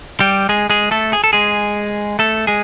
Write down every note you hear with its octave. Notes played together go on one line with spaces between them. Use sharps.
G3 G4
G#3 G#4
G#3 G#4
A3 A4
G#4
A4
G#3 G#4
A3 A4
G#3 G#4